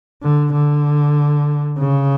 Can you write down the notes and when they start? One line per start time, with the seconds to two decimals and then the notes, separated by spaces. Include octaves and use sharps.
0.22 D3
0.53 D3
1.78 C#3